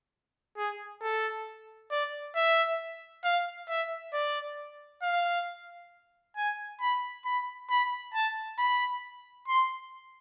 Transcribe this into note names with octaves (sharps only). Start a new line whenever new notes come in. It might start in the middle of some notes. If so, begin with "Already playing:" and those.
G#4
A4
D5
E5
F5
E5
D5
F5
G#5
B5
B5
B5
A5
B5
C6